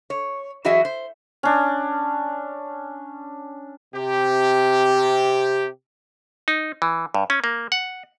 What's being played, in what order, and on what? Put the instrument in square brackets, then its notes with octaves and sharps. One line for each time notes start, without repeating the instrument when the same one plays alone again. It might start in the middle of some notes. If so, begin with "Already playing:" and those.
[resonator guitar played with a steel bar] C#5
E3 F#3 F#4 G#4 D#5 E5
C5
[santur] C#4 D4
[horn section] C3 G4
[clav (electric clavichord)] D#4
E3
G2
C#4
A#3
F#5